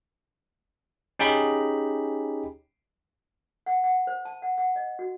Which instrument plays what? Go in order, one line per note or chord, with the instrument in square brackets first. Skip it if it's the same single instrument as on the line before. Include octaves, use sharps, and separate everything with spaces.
[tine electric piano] C#4 D#4 G4 G#4 B5
[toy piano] F#5
F#5
C5
A5
F#5
F#5
D#5
F#4